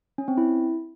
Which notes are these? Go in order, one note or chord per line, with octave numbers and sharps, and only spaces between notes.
C#4
C4
E4